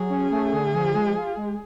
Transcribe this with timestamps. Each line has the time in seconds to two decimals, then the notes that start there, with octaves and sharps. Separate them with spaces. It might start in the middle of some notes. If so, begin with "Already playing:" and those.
Already playing: F#3 G#4
0.10 C#4
0.31 A3
0.52 D3
0.73 F3
0.95 G#3
1.16 F4
1.37 G#3